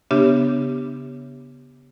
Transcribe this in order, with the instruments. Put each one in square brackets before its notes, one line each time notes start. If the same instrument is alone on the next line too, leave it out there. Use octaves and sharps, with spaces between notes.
[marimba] C#3 B3 D4 G4 E5